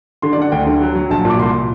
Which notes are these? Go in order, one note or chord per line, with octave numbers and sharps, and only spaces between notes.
D3 C6
D5
D3 F#5
D2 G5
D3
F#3
F#3
A#1 A5
A#2 D6
C2 C6